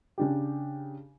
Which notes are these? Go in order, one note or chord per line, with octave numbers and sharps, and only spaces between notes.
C#3 D4 G4